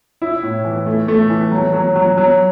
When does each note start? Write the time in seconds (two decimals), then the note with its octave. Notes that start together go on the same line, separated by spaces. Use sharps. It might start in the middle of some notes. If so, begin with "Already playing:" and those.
0.22 E4
0.43 A2
0.65 E3
0.86 A3
1.08 A3
1.30 E3
1.52 F#3
1.73 F#3
1.96 F#3
2.17 F#3